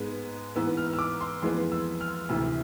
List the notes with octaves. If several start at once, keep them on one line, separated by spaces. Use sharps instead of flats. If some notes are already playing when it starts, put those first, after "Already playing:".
Already playing: G#2 G#3 B3
G#2 E3 B3 E6
F6
E6
D6
C6
F2 E3 G#3 B3 C6
E6
F6
D2 C3 E3 E6